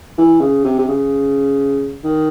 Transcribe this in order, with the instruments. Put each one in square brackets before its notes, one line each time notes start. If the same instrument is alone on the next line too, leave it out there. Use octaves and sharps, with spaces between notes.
[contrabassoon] E3
C#3
C3
C3
C#3
D#3